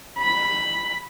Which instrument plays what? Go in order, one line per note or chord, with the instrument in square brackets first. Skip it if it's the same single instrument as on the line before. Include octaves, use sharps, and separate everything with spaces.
[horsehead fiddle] B5